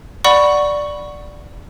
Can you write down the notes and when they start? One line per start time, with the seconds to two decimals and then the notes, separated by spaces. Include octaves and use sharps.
0.24 D5 F#5 B5 C#6